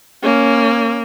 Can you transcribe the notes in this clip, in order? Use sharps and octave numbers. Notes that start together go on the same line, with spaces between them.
A#3 C#4